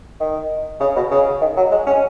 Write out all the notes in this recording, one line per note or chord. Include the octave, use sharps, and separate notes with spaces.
D#3
C#3
B2
C#3
D#3
F#3
G#3
C#4